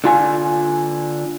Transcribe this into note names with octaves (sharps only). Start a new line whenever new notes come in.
D3 F4 G#5